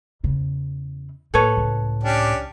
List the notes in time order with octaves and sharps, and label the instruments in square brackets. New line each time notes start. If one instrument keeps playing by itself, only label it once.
[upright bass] E2 C#3
[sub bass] A2 [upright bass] A#3 F4 [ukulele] A4 B4 C#5
[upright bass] C#2
[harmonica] C#4 D4 G4